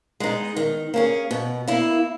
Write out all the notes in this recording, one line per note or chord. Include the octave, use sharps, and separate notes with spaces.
G#3 B3 D#4
D#3
A#3 C#4 G#4
B2
A#3 E4